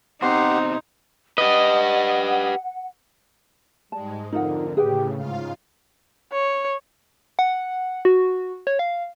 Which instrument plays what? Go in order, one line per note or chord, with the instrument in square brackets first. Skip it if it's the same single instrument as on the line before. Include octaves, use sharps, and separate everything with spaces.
[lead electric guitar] B2 C4 [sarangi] D#4 [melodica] G4 F#5 [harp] C6
[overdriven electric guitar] G4 B4 [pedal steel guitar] D#5 [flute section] F#5
[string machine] G#2 G#3 [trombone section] G3 [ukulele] A5
[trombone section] F2 A#4 [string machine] D3 [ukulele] D#4 F4 F#5
[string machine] A2 C#3 [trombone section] G4 [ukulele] G#4 B4 G5
[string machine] G#2 F4 F5 [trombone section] C#3
[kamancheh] C#5
[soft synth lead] F#5
F#4
C#5
F5